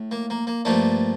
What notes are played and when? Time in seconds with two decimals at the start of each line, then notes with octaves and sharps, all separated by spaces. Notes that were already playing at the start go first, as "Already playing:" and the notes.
Already playing: A2
0.11 A#3
0.30 A#3
0.47 A#3
0.65 G2 F3 A3 A#3 D4